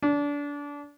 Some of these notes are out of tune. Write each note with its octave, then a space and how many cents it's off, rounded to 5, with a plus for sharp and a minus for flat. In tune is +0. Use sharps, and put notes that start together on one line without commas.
D4 -25